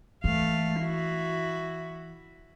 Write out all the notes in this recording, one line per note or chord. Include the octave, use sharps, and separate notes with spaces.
E3 A3 F5
E4 F#4